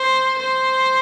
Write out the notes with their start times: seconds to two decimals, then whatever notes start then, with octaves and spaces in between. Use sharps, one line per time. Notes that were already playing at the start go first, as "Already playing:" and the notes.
Already playing: C5
0.40 C5